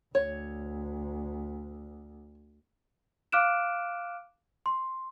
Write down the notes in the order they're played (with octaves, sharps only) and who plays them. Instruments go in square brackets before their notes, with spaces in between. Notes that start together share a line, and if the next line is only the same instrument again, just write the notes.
[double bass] D2 [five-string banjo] C#5
[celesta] F5 D6 F6 F#6 D7 E7
C6